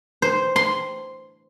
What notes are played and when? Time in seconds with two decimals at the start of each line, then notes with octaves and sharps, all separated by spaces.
0.22 C5
0.56 C6